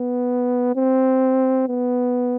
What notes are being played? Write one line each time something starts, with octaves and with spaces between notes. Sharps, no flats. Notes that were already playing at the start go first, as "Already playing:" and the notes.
Already playing: B3
C4
B3